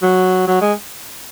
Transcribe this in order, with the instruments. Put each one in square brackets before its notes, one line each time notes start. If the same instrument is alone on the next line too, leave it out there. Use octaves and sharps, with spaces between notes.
[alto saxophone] F#3
F#3
G#3